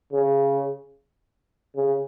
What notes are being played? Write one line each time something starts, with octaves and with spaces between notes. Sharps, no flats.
C#3
C#3